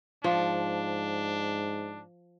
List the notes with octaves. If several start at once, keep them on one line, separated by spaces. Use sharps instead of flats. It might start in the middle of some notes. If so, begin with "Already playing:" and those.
G#2 F3 D4